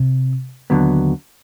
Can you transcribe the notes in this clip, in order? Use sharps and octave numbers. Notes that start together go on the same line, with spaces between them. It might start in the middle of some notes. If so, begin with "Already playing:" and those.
Already playing: C3
D#2 D3 F#3 B3